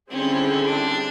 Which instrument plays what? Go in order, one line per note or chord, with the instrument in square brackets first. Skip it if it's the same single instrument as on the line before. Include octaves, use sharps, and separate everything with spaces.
[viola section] D3 G3 C4 E4 G#4 [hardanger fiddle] C#4
[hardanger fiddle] D4